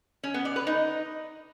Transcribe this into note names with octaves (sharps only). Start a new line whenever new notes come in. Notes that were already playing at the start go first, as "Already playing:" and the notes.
C#4
B3
D5
B4
D#4